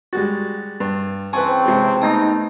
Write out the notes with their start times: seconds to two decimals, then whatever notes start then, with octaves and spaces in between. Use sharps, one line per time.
0.13 G3 G#3 F#4 A6
0.80 G2
1.33 C#3 E3 C4 B4 G#5 A5 C#6
1.66 C3 G#3
2.02 A3 B3 D#4 A5